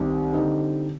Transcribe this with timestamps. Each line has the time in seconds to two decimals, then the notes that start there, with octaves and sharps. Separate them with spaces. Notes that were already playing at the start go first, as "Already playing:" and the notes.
Already playing: C2 C3 D#3 G3
0.33 D3 G3 C4 D#4